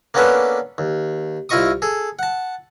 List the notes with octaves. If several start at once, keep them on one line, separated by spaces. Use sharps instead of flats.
A#3 B3 C#4 D4 A4 B4
D#2
C2 E4 F4 D#5 C#6 D#6
G#4 A4
F#5 A5